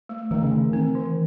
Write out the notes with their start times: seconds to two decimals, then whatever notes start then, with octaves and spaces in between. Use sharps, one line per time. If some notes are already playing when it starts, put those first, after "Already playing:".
0.09 A3
0.31 D#3 A3
0.42 C#3
0.52 D#3 E3
0.73 D#3 C4
0.95 E3